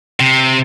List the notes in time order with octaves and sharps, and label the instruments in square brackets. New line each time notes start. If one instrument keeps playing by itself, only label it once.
[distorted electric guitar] C3